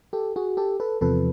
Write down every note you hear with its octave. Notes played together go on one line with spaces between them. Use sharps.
G4 A4
F#4 G#4
G4 A4
A4 B4
E2 C3 F3 A4 B4